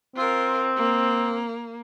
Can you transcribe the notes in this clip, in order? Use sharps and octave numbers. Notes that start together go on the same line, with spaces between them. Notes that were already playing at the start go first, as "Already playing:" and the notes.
C4 F4 A#4
A#3